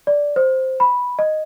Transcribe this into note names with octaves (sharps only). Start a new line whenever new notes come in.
D5
C5
B5
D#5